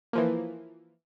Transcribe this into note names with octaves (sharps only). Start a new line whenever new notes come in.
E3 F3 A#3